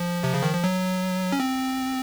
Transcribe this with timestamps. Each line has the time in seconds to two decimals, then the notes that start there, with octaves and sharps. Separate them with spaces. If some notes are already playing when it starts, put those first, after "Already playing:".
Already playing: F3
0.24 C3
0.34 C#3
0.43 D#3
0.54 F3
0.64 F#3
1.32 C#4
1.40 C4